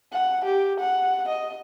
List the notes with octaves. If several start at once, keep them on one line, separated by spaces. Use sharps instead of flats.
F#5
G4
F#5
D#5